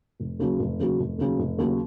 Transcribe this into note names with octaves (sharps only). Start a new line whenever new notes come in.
F1
D#2 C#3 F#3
F1
D#2 C#3 F#3
F1
D#2 C#3 F#3
F1
D#2 C#3 F#3